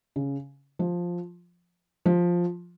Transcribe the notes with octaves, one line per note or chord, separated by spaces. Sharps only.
C#3
F3
F3